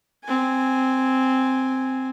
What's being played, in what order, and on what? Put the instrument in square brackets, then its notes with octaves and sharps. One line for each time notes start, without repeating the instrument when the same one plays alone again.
[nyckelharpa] C4 G#5